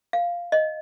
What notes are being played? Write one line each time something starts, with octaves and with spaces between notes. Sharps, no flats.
F5
D#5